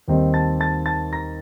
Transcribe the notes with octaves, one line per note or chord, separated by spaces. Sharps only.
D#2 D#3 G3 C4 D#4
A5 A6
A5 A6
A5 A6
A#5 A#6